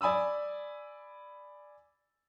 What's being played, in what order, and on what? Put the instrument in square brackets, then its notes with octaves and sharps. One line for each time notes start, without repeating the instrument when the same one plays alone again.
[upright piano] D5 G#5 B5 D#6 E6